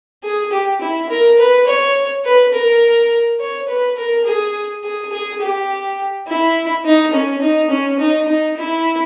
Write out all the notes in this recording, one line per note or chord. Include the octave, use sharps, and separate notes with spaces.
G#4
G4
E4
A#4
B4
C#5
B4
A#4
C#5
B4
A#4
G#4
G#4
G#4
G4
E4
D#4
C#4
D#4
C#4
D#4
D#4
E4